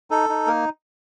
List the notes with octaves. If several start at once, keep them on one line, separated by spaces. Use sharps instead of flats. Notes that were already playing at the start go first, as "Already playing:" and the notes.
D#4 A4
D#4
A#3 A#4